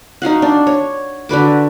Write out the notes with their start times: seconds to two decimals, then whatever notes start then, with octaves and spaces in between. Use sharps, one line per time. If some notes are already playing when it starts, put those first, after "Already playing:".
0.22 D#4 F#4 F5 F#5
0.42 D4
0.67 C#5
1.29 D3 F#4 B4 D6